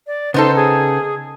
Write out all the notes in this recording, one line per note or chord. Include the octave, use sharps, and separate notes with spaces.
D5
C#3 B3 D#4 A4 C5
G#4